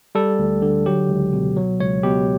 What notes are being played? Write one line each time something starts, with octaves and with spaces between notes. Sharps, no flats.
G3 A4
D2
D3
F#3 G4
C#2
B2
F#3
C#2 C#5
B2 G4